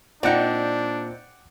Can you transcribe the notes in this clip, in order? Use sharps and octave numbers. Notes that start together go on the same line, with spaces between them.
A#2 C4 D4 D#4 D5 F#5 G5